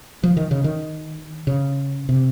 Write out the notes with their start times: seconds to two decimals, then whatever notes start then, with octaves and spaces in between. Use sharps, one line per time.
0.23 F3
0.37 D#3
0.51 C#3
0.64 D#3
1.47 C#3
2.09 C3